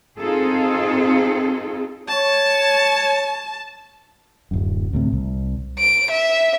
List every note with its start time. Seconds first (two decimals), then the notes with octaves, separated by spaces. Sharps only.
0.18 C4 D#4 F4 G#4 A4
2.08 C#5 A5
4.51 D1 F#2
4.93 D2 A2 C3
5.12 C2
5.78 D7
6.11 E5